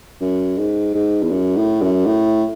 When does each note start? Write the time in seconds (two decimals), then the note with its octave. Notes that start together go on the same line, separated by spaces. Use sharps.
0.21 F#2
0.58 G#2
0.94 G#2
1.23 E2
1.31 F#2
1.56 A2
1.81 F#2
2.06 A2